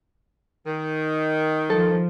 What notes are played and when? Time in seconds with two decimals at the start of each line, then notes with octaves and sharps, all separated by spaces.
0.67 D#3
1.70 F3 A4